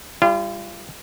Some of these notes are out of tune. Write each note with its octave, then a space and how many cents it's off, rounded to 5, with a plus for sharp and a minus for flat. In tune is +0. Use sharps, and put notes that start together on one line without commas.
G3 +15 F4 -35